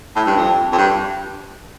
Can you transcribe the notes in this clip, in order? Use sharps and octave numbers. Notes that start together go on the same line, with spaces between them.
A2
G2
F2
F2
G2